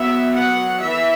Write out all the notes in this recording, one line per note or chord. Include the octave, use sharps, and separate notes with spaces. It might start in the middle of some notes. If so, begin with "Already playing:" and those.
Already playing: F#3 B3 E5
F#5
E3 E5